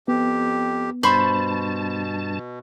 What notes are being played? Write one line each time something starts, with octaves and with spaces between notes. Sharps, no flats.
F2 B3 G4
G2 B2 C5 A5 B5 C#6